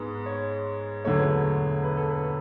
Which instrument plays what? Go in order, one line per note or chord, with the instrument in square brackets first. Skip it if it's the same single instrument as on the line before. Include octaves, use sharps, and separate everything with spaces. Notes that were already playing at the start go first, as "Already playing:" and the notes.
Already playing: [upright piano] G#2 G#3 B3
C#5
E1 D2 D3 F#3 A3 C#5
B4
C#5
B4
A4
B4